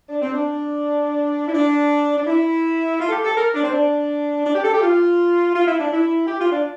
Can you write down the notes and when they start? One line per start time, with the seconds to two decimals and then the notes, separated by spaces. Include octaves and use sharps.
0.09 D4
0.21 C4
0.34 D4
1.48 E4
1.54 D4
2.17 D4
2.27 E4
3.00 F4
3.08 A4
3.11 G4
3.25 A4
3.36 A#4
3.55 D4
3.63 C4
3.73 D4
4.45 D4
4.54 G4
4.64 A4
4.73 G4
4.82 F4
5.54 F4
5.67 E4
5.79 D4
5.92 E4
6.27 G4
6.40 F4
6.52 D4